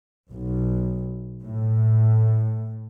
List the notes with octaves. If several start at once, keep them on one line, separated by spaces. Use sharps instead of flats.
B1
A2